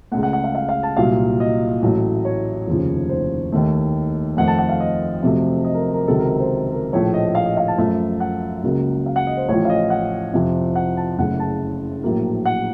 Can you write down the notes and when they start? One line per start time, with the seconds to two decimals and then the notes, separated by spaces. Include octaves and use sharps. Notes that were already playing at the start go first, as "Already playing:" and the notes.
0.11 C#2 C#3 A3 F#5
0.23 F#5
0.33 F#5
0.44 F5
0.55 F5
0.69 F5
0.83 A5
0.97 C2 A#2 F#3 F5
1.40 D#5
1.82 A1 A2 F#3 A3
2.25 C#5
2.67 F1 D#2 C#3 F3
3.09 C5
3.52 D#2 D#3 A3
4.37 F2 D#3 A3 F#5
4.48 A5
4.59 F#5
4.69 F5
4.80 D#5
5.22 F2 C3 F#3 A3
5.65 D#5
5.74 A#4
5.79 C5
5.93 A#4
6.08 C#2 C3 D#3 F#3 A4
6.19 A#4
6.30 A#4
6.40 C5
6.72 A#4
6.93 A#1 A2 F3 A3 C#5
7.14 D#5
7.35 F5
7.46 D#5
7.57 F5
7.68 A5
7.78 F#2 F3 A3
8.20 F#5
8.63 C#2 C#3 F#3 A#3
9.06 F5
9.16 F#5
9.27 D#5
9.37 C5
9.48 A1 A2 F3 C#5
9.65 F5
9.70 D#5
9.90 F#5
10.34 F2 C3 F3
10.76 F#5
10.97 A5
11.18 F#1 F#2 C#3 A3 F#5
11.40 A5
12.03 A#1 A2 F#3 A#3
12.46 F#5